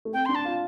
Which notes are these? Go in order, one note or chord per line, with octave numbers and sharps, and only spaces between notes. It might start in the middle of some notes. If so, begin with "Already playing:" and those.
A3
C4 G5
D4 C6
A5
F4